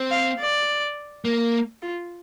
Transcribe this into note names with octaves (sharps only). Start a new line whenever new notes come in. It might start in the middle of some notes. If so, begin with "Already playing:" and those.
Already playing: C4
F5
D5
A#3
F4